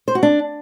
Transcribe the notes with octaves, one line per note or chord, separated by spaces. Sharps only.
C5
F#4
D4